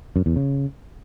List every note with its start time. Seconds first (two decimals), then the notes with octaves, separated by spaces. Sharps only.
0.16 F#2
0.26 E2
0.36 C#3